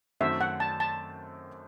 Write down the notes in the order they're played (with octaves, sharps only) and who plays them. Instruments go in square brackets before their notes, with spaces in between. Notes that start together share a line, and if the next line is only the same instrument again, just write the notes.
[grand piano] F#2 D#3 A3 C4 F#4 [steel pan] E5
[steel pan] F#5
A5
A5